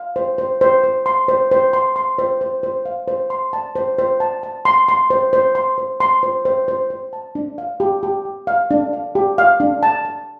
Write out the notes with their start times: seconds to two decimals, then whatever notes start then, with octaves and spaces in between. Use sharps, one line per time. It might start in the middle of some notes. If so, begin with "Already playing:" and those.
Already playing: F5
0.16 C5
0.38 C5
0.61 C5
0.84 C5
1.06 C6
1.28 C5
1.51 C5
1.73 C6
1.96 C6
2.18 C5
2.41 C5
2.63 C5
2.86 F5
3.08 C5
3.30 C6
3.53 A5
3.76 C5
3.98 C5
4.20 A5
4.43 A5
4.65 C6
4.88 C6
5.10 C5
5.33 C5
5.55 C6
5.78 C5
6.00 C6
6.23 C5
6.45 C5
6.68 C5
6.90 C5
7.13 A5
7.35 D4
7.58 F5
7.80 G4
8.03 G4
8.25 G4
8.47 F5
8.71 D4
8.93 F5
9.15 G4
9.38 F5
9.60 D4
9.83 A5
10.05 A5